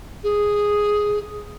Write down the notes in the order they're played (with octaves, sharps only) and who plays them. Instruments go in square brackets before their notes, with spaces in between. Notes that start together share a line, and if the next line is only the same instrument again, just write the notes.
[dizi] G#4